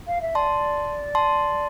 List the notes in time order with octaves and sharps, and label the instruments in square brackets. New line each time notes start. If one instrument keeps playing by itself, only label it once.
[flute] F5
E5
[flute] D5 [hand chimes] A5 C6
[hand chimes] A5 C6